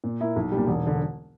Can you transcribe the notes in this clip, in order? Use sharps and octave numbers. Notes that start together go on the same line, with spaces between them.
A#2
A#3 E4
B1
G3
A#2
E1
D3